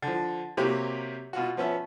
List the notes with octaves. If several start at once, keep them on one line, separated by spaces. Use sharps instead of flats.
D3 F3
C3 F#3 A#3 G4
B2 F4 F#4
F3 B3 C#4 E5